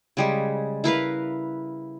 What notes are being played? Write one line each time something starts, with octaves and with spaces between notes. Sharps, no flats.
C#3 G3 G#3
E4 A#4 B4 F5